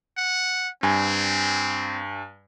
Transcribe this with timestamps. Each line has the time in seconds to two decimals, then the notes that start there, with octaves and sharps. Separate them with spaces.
0.17 F#5
0.83 G2 C4 G#5